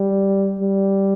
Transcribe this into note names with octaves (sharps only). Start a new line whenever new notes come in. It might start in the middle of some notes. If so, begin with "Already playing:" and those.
Already playing: G3
G3